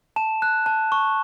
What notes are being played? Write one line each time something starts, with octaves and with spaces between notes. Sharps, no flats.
A5 E7
F#6
A5
C#6